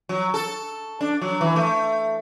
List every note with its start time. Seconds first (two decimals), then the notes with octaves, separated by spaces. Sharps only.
0.09 F#3
0.34 A4
1.01 D4
1.22 F#3
1.41 E3
1.56 A3